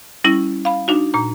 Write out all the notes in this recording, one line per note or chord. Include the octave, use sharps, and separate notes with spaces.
G3 C#4 E4
F5 B5
D4 D#4 F#4
A#2 A#5